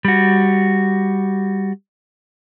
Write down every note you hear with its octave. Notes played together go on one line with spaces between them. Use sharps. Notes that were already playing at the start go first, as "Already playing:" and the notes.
G3 F#4